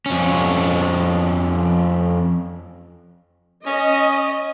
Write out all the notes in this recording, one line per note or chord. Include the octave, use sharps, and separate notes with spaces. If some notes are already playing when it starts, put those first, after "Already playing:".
F2 C#4
C#4 D#5